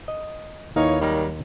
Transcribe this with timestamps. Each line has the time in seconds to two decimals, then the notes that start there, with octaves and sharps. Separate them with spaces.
0.08 D#5
0.76 D#2 E3 A#3 D#4 C#5 F5
1.01 D#3 F#3 G3 A#4